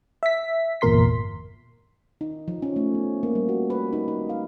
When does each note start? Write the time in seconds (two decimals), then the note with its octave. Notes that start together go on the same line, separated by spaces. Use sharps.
0.23 E5 B6
0.81 G1 E2 A#2 A#4 C6 B6
2.21 D#4
2.48 F3
2.62 C#4
2.76 A3
2.94 B3
3.23 A#3
3.35 G3
3.49 F#4
3.70 B4
3.93 D#4
4.08 D#4
4.29 F5